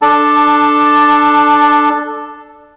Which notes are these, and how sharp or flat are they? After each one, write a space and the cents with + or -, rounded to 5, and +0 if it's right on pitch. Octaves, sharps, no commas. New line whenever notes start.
D4 +10 A4 +0 A5 +0